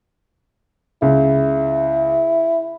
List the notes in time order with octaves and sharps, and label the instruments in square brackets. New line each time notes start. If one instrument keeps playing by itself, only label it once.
[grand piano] C#2 [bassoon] E4